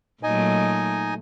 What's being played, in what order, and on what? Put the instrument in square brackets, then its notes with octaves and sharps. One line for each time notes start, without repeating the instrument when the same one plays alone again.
[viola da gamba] A#2 F#3 A3 [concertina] D#4 D#5 G#5